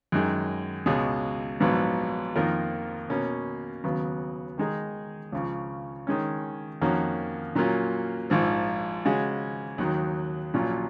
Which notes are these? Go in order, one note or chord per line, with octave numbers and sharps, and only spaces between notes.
F#2 D#3 G#3
C#2 B2 G#3
A#1 G#2 F#3 B3
F2 D#3 A#3 F4 A#4
B2 A#3 C#4
D#2 C#3 F#3 B3
D#3 G#3 D#4 G#4
C#2 C#3 F3
D#3 G#3 C#4
F2 D#3 A#3 C#4 F#4
A#2 F#3 A#3 C#4 F4
A#1 G#2 F3
C#3 G#3 C#4 F#4
D#2 D#3 F#3
A#1 A#2 F#3 C#4 F4